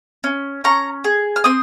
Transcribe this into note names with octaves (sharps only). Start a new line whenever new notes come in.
C#4
C#4 A#5 C#6
G#4
F6
C4 C6 D#6